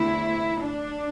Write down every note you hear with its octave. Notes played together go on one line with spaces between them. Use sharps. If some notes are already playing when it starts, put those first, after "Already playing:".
Already playing: E2 D3 A3 C4 E4
D4